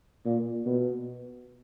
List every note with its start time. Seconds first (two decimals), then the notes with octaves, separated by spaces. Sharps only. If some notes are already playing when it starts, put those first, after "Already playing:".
0.25 A#2
0.66 B2